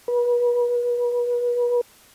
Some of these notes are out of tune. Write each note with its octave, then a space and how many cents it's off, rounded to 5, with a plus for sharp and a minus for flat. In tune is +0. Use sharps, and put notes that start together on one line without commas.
B4 -35